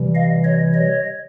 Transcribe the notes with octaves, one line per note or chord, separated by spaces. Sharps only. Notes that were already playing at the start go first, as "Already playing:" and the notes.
Already playing: C3 E3 G3
D#5 F5
C#5 D#5
C#5 D#5